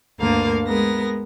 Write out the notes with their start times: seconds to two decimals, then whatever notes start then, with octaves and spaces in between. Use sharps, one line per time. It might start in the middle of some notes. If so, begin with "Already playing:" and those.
0.20 D2 G2 D3 A#3 A#4 F5
0.66 G#3 B3 A#4 A#6